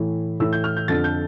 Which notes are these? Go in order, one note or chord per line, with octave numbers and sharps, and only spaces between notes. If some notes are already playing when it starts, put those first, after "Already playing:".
Already playing: A2 E3
A2 E3 E6
G6
F6
G6
F2 D3 F3 A6
G6